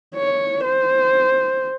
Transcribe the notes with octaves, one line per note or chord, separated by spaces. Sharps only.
C#5
C5